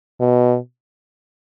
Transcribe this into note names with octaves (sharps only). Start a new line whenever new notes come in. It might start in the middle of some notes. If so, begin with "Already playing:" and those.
B2